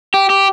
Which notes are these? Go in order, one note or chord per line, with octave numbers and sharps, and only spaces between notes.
G4
G4